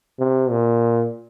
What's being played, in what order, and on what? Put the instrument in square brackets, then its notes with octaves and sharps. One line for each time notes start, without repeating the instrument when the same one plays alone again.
[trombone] C3
A#2